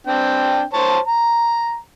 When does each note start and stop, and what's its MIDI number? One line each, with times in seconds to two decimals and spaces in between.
0.07 0.62 60
0.07 0.62 62
0.07 0.62 79
0.74 0.98 72
0.74 0.98 73
0.74 0.98 81
1.07 1.77 82